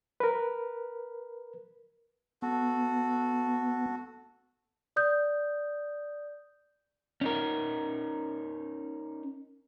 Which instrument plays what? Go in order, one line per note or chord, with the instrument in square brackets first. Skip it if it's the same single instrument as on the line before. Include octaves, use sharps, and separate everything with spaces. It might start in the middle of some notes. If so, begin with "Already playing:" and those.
[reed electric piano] A#4 B4
[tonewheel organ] B3 [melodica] F#4 A4
[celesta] D5 D#6 G6
[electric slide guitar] C#4 D#4 A#4